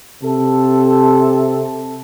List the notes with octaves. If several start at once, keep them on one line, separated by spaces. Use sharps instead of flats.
C3 A4